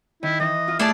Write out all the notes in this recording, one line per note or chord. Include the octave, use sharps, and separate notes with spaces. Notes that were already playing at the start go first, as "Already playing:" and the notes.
D#3 E4
E3 D#5
F4
A3 E4 G#4 D5 A5